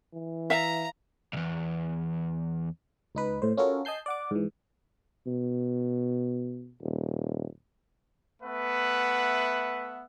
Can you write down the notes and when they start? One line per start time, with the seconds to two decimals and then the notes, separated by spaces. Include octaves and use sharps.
0.13 E3
0.50 E5 F5 A#5
1.33 B1 E2
3.15 C#2 D#4 B4
3.42 A2 C5
3.57 C#4 F4 F#4 A4 A#4 C#5
3.85 D#5 G#5 A5 G6 C7
4.06 D5 F#5 D6
4.31 G#2 E3
5.27 B2
6.82 D#1
8.43 A3 B3 B4 E5 F#5